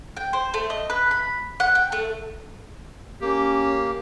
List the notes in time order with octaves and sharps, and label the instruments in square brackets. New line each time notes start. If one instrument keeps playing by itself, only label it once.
[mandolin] G5
C5
A3
D#5
B4
B5
F#5
G5
A3
[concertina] A#3 [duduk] C#4 [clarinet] G4